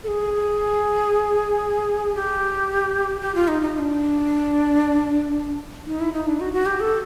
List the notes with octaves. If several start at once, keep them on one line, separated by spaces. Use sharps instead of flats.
A4
G#4
G4
G4
F4
D#4
D#4
D#4
D4
D#4
E4
D#4
D4
F#4
F#4
G4
A4